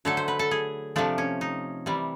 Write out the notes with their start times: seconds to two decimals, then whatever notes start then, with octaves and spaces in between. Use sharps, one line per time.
0.05 D3 F#3 A3 A4
0.17 C5
0.28 B4
0.39 A4
0.51 G#4
0.96 C3 F3 A3 D4
1.18 C#4
1.41 D#4
1.86 C3 E3 G3